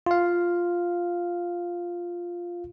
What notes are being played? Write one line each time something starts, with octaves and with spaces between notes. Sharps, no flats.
F4 F5